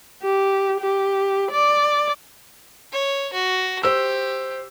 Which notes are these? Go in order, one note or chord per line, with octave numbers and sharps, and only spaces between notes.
G4
G4
D5
C#5
F#4
G4 C5 E6